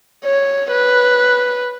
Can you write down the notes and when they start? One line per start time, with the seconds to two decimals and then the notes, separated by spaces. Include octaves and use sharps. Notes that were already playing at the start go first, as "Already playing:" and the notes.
0.24 C#5
0.72 B4